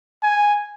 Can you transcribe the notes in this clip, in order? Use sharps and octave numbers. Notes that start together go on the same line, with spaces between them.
G#5